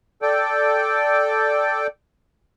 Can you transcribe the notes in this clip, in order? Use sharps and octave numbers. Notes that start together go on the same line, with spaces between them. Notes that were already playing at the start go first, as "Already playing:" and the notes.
A4 D5 G5